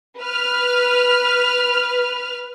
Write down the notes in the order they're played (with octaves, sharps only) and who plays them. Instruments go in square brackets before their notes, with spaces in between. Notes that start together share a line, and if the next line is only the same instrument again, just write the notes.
[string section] B4 F6